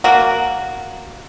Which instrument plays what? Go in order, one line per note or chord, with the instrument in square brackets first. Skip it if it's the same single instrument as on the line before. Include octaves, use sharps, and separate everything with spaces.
[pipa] A#3 F#4